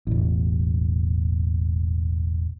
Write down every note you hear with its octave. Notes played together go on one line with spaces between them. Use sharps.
E1 A1